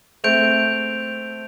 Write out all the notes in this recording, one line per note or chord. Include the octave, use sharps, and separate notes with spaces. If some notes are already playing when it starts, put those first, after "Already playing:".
A3 C4 G6 D7 F7